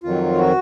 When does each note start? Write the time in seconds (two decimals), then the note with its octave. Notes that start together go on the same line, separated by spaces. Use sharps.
0.03 F2 D#3 F#3 F4
0.38 F#4